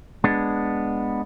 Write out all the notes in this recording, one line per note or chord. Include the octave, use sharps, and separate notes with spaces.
G#3 B3 D4